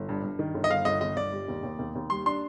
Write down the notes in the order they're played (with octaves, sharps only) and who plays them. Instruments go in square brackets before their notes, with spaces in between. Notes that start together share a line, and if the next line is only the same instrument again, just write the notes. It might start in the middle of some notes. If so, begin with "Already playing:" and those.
Already playing: [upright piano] G1
G2
G2
D#3
G1
[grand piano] D#5
[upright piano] G1 [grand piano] F5
[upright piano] G1 [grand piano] D#5
[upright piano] G1 [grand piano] D#5
[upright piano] G1 [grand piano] D5
[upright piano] G3
D#2
D#2
D#2
D#2
[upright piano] G3 [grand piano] C6
[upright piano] D4 [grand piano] C6